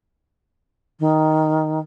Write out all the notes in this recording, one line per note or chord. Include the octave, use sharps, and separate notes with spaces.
D#3